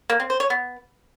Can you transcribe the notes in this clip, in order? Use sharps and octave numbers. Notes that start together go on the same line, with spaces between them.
A#3
C4
C5
C#5
B3